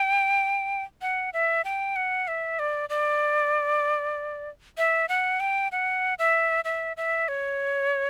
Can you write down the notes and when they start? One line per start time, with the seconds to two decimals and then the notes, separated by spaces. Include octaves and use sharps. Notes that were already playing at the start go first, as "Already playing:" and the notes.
Already playing: G5
1.02 F#5
1.33 E5
1.65 G5
1.96 F#5
2.28 E5
2.59 D5
2.90 D5
4.78 E5
5.09 F#5
5.40 G5
5.72 F#5
6.19 E5
6.65 E5
6.97 E5
7.28 C#5